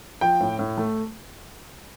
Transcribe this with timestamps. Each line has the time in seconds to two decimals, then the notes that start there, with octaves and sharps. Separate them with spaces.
0.21 F3 G5
0.41 A2
0.59 A2
0.78 A3